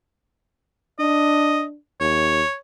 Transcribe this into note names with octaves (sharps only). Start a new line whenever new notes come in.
D4 D#5
D#2 C#5